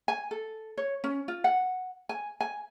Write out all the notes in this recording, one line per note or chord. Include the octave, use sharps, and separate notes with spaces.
G#5
A4
C#5
C#4
F4
F#5
G#5
G#5